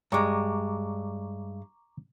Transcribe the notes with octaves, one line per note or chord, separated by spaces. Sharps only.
G2 G#3 A#5 C#6 D6